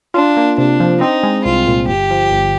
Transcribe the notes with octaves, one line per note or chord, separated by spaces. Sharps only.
D4 F4
A#3
C3 D4
F3
C4 D#4
G#3
C2 F4
A#2
G1 G4
F3
G1